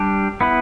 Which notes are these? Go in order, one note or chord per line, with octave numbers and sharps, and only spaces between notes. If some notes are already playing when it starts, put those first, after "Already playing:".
Already playing: G3 D4 G4
B3 E4 B4